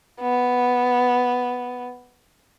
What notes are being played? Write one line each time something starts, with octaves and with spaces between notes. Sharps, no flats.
B3